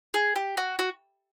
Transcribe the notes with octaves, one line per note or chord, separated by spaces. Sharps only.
G#4
G4
F#4
F#4